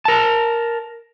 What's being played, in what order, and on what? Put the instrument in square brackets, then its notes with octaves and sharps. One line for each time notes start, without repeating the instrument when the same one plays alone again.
[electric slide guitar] A#4 A5